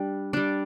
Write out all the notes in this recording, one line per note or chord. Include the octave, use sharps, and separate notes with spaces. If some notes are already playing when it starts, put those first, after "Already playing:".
Already playing: G3 D4
G3 D4